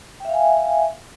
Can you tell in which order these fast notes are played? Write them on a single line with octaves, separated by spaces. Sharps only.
G5 E5 F5 G#5